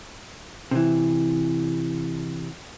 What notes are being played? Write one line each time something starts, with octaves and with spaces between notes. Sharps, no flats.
C3 E3